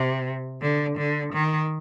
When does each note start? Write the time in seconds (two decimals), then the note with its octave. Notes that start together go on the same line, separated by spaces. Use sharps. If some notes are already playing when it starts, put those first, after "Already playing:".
Already playing: C3
0.61 D3
0.98 D3
1.33 D#3